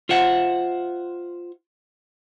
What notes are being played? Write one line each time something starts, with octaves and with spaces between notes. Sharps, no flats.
F4 C5 E5 F#5